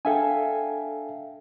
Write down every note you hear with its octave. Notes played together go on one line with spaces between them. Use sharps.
D4 A4 E5 F5 G5 G#5